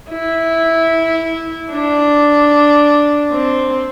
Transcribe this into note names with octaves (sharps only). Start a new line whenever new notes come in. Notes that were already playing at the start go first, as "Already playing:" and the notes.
E4
D4
C4